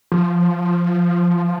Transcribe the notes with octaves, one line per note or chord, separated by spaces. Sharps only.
F3